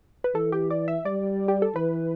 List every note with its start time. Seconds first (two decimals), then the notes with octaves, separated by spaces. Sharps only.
0.24 B4
0.34 E3 A4
0.52 G4
0.70 D5
0.88 E5
1.05 G3 D5
1.48 G4
1.62 A4
1.75 E3 B4